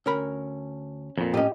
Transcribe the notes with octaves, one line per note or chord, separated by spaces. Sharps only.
D2 C#4 A#4 B5
F2 A#2
A2 C#4 G4 D#5